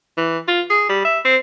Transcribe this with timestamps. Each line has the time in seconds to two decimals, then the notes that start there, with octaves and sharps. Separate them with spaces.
0.17 E3
0.48 F4
0.70 G#4
0.89 G3
1.05 E5
1.25 C4